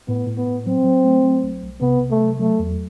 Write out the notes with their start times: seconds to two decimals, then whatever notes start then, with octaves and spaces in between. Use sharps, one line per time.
0.08 A2 B3
0.27 A2
0.37 B3
0.47 A2
0.66 F#3 C4
0.85 F#3
1.04 A3
1.23 F#3
1.43 B1
1.63 B1
1.81 C3 B3
2.01 C3
2.11 A3
2.21 F#3
2.40 F#3 A3
2.59 E2